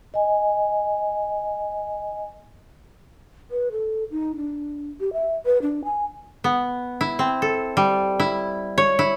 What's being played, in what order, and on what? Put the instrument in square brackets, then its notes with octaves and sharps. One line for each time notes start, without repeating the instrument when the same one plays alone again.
[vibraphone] D#5 G#5
[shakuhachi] B4
A4
D#4
D4
G4
E5
B4
D4
G#5
[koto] B3
E4
C4
A4
G3
E4
C#5
E4